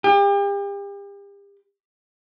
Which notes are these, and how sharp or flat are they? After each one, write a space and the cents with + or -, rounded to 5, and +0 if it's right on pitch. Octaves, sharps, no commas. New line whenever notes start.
G4 +40